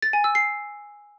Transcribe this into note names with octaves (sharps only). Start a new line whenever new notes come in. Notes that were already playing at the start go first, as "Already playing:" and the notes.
A6
G#5
E6
C7